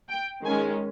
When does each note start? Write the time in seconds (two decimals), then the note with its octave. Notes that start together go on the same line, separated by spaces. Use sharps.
0.09 G5
0.45 D#3 G#3 C#4 G#5